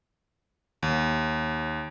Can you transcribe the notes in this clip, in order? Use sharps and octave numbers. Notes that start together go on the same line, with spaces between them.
D#2